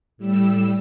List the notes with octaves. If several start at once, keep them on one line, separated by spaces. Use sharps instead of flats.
A2 G3 E6